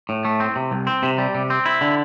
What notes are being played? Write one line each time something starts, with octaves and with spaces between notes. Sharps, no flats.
A2
A3
C4
C3
C2
C4
C3
G3
C3
C4
E4
D3